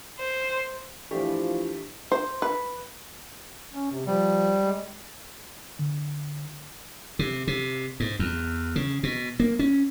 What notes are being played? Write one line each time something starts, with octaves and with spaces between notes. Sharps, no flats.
C5
E3 F3 A3 D4 G4
C5
B4
C#4
C3
F3 G3
G#3
D3
C3
C3
G#2
E2
C#3
B2
A#3
C#4